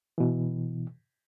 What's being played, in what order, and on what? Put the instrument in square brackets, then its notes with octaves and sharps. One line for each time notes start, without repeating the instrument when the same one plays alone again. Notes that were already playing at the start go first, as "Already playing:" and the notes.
[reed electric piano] B2 E3